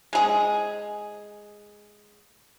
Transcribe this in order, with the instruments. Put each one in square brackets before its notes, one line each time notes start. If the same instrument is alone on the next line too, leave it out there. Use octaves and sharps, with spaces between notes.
[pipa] G#3 G#4